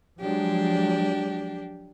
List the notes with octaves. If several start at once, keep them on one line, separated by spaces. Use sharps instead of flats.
F3 F#3 G#3 D4 G4